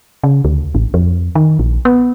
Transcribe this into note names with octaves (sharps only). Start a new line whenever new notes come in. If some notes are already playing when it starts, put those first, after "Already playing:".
C#3
D2
A1
F2
D#3
A#1
B3